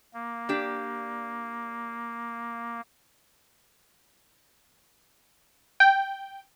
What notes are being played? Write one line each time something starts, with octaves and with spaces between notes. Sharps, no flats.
A#3
D4 G4 D5
G5